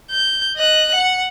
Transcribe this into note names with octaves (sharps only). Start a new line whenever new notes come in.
G6
D#5 F#6
F#5